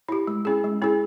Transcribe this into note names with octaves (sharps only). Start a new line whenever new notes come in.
E4 G4
G#3
C#4 E4 G#4
G#3
C#4 E4 G#4